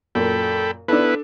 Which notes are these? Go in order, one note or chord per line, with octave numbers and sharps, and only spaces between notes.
F#2 A#2 A4 G5 B5
B3 D4 E4 A4 B4